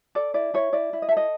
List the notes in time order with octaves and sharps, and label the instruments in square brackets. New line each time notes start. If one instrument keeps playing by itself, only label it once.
[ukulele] A4 D5
E4 D5
E4 C#5
E4 D5
E4
D#5
E5
A4
D#5